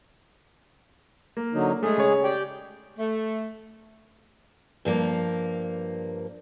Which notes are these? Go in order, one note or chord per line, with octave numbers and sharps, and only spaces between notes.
A#3
D3 F#3 D#4
G#3 A3 G#4
C#3 C#5
G4 D5 G5
A3
G2 F3 A#3